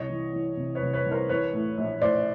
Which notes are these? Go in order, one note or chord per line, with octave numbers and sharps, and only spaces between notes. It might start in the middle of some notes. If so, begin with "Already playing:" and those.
Already playing: C2 C#5 D#5
E3
E3
C3
B4 C#5
C2
B4 C#5
C2
A#4 C5
E3 B4 C#5
A2
A#1
A2 C5 D5